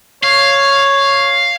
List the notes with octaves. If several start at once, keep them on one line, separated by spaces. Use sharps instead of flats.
C#5 F5